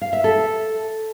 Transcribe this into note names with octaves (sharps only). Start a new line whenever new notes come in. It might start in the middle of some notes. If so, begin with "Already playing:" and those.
F5
E5
A4